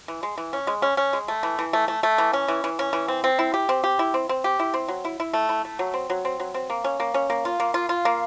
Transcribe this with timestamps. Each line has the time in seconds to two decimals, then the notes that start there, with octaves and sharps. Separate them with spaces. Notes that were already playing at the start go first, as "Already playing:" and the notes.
0.08 E3
0.23 G#3
0.38 E3
0.53 C#4
0.67 G#3
0.82 C#4
0.97 C#4
1.13 G#3
1.28 A3
1.43 E3
1.59 E3
1.73 A3
1.88 A3
2.03 A3
2.18 E3
2.33 C#4
2.48 E3
2.64 E3
2.79 C#4
2.93 E3
3.08 C4
3.24 C4
3.39 E4
3.54 G4
3.69 C4
3.84 G4
3.99 E4
4.14 C4
4.29 C4
4.44 G4
4.59 E4
4.74 C4
4.88 F#3
5.05 E4
5.20 E4
5.33 A3
5.49 E4
5.65 A3
5.79 F#3
5.94 C4
6.10 F#3
6.25 C4
6.40 F#3
6.54 C4
6.70 A#3
6.84 C#4
7.00 A#3
7.14 C#4
7.30 A#3
7.45 F4
7.60 A#3
7.74 F4
7.89 F4
8.05 A#3